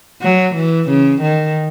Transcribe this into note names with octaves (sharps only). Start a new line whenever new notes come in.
F#3
E3
C#3
D#3